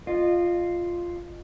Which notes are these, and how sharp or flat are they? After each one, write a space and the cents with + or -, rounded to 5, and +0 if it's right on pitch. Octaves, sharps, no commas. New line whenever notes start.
F4 +0 D#5 -25